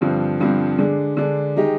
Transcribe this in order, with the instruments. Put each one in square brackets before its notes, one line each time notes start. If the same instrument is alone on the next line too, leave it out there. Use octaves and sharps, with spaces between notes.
[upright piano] G2 D3 F3 C4
G2 D3 F3 C4
D3 G#3 D4
D3 G#3 D4
D#3 G#3 D#4 G4